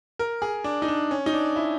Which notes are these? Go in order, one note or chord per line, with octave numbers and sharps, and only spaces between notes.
A#4
G#4
D4
D#4
D4
C#4
D#4
D4
E4